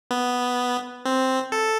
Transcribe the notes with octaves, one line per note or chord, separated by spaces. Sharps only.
B3
C4
A4